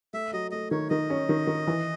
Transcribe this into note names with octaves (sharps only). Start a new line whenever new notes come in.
A3 E5
F#3 D#5
A3 D#5
D#3 C#5
D#3 D#5
C#4
D#3
D#3
E3